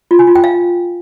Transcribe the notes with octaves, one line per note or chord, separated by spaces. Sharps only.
F4
G#5
F4
G5
F5